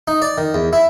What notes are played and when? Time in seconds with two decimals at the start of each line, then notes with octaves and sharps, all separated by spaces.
0.08 D#4
0.22 D5
0.38 D#3
0.54 E2
0.73 E4